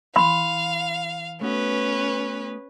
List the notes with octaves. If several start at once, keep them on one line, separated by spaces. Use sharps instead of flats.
E3 F5 B5 C6
A3 B3 C#4 F#4 B4